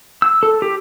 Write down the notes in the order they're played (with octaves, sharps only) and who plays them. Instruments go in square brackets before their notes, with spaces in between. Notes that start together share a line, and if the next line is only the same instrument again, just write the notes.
[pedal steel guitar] E6
A4
G4